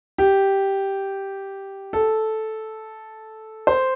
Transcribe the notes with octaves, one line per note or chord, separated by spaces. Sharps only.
G4
A4
C5